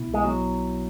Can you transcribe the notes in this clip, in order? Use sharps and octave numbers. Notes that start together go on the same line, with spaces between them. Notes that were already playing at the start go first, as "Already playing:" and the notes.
Already playing: B2 B3 E4
B1
G#3
F#3 B3